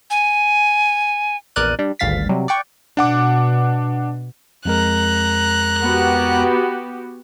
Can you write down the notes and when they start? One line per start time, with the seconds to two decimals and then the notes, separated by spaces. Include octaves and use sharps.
0.10 G#5
1.56 A#1 E2 A#4 D5 F#6 D#7
1.79 G3 D4
1.99 G#1 D2 G2 F5 A6 B6
2.29 C3 F#3 G3
2.48 D5 F#5 G5 C#6
2.97 B2 D4 F#5 D6
4.65 F2 G#3 A#4 A#5 F#6
5.83 B3 F#4 G4